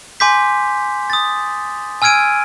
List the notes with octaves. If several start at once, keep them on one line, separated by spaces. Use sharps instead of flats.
G#5 C6 D6 G6 B6
D#6 A6
G#5 E6 F6 G#6 D7 D#7